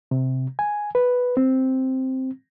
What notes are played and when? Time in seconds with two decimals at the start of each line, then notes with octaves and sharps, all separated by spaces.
0.11 C3
0.59 G#5
0.95 B4
1.37 C4